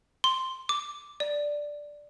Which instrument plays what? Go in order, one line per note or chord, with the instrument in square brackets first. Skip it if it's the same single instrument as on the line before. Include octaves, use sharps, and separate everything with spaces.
[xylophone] C6
D6
D5